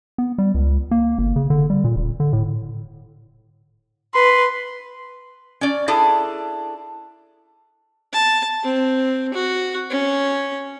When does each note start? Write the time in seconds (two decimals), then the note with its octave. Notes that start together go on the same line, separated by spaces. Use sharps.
0.18 B3
0.38 G3
0.54 C#2
0.91 A#3
1.18 G1
1.36 C#3
1.50 D3
1.70 G3
1.84 A#2
1.96 D#1
2.20 D3
2.33 A2
4.15 B4 C6
5.61 C#4 D5
5.88 D4 E4 G#4 A4
8.13 A5
8.63 C4
9.33 F#4
9.90 C#4